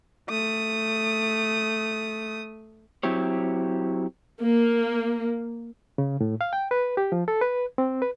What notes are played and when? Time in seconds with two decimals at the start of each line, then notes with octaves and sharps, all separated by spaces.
0.29 A3 D#6
3.03 F#3 C4 E4 G4 C#5
4.42 A#3
5.98 C#3
6.21 A2
6.41 F5
6.53 G5
6.71 B4
6.97 G4
7.12 F3
7.28 A4
7.41 B4
7.78 C4
8.02 B4